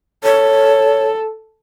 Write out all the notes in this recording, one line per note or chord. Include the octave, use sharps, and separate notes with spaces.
A4 C#5